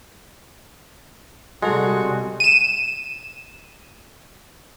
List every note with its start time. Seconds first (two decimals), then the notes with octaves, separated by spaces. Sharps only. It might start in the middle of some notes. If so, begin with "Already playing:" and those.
1.62 C3 G3 G#3 F#4 A4 C6
2.40 D#7 E7